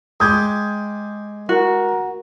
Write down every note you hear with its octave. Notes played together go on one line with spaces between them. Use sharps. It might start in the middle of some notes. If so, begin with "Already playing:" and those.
G#3 G4 D#6 G6 G#6
F#4 A#4